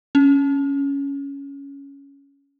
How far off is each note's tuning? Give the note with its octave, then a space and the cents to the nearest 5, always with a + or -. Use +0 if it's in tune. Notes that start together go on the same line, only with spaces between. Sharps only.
C#4 +10